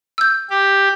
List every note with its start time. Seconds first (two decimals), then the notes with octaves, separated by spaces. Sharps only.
0.18 E6 G6
0.50 G4